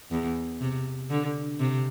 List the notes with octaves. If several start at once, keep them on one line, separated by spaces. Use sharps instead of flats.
E2
C3
D3
C3